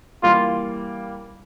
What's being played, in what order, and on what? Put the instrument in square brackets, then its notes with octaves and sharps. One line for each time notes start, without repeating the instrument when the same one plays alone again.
[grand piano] E3 G3 A#3 [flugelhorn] F4